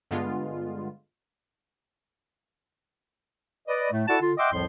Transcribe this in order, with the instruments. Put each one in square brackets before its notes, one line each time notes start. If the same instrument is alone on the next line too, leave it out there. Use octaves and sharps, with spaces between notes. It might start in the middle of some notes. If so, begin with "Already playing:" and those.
[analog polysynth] G2 D3 G#3 B3 F4
[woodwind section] B4 D5 D#5
A2 A3
E4 F#4 A4 D5 F#5 A5
D3 F4
D#5 E5 F#5 G5 C6 D6
C2 F2 A2 F3 C6